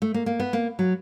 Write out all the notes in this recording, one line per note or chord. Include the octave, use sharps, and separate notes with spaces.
A3
A#3
A#3
B3
A#3
F#3